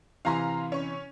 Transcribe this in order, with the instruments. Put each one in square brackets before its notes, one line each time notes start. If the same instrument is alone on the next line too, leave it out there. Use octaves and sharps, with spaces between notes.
[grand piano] C3 E3 G#5 [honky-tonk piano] F5 A#5 C6
[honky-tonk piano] C#4 C#6